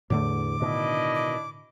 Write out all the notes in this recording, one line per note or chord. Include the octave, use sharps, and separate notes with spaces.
E2 A2 D3 A3 D6
B2 D#3 D4 E4 D#5
D6